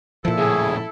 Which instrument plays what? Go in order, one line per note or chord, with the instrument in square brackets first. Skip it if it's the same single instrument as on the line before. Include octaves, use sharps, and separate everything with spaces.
[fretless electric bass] A#2 F3 [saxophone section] E4 A4
[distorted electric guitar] A2 C#3 [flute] G#4